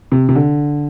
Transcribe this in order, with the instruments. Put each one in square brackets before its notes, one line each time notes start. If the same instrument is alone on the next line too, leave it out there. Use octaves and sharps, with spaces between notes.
[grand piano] C3
C3
D3